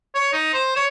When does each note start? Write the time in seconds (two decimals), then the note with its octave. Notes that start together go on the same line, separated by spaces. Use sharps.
0.15 C#5
0.33 D#4
0.54 C5
0.76 C#5